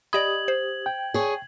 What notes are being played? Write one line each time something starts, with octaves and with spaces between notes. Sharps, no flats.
G4 D5 D#5 B5 D#6 G#6 F#7
C5
G5
G#4 C#5